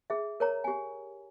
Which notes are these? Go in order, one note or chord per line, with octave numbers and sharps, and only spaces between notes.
G#4 E5
A#4 C#5 A#5
G4 G#5